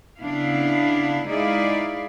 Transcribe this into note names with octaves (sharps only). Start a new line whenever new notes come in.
C#3 B3 D4 E4 F5
G#3 D#4 E4 G#4 D5 F5